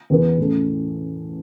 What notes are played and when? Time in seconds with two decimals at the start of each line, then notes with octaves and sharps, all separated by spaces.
0.10 E2 E3 B3
0.38 A2 E3 C#4 A4